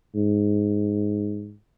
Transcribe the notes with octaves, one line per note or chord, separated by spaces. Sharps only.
G#2